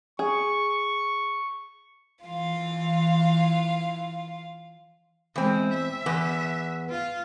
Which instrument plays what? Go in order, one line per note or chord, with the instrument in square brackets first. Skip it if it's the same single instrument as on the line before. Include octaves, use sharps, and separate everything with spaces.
[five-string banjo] G#4 [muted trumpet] C#6
[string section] E3 [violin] F4 F5
[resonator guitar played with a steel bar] E2 C4 [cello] G#3
[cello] E5
[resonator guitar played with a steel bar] E2 B3
[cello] F4